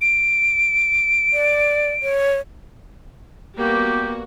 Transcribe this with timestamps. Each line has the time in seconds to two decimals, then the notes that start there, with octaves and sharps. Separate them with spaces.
0.01 D7
1.33 D5
2.03 C#5
3.57 G3 A#3 B3 F#4 G4